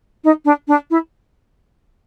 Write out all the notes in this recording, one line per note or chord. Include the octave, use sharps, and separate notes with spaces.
D#4
D4
D4
E4